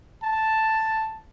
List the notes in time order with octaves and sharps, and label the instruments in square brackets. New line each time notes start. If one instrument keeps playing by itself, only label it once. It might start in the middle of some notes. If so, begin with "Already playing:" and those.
[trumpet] A5